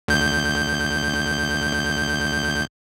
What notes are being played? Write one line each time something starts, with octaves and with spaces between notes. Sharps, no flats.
D2 G6